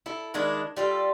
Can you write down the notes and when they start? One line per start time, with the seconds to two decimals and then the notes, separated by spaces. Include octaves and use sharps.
0.06 E4 A4
0.34 D#3 G#3 D4 E4
0.77 G3 F4 A4